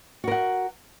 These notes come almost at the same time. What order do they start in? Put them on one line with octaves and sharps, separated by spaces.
F#4 A#4 F#5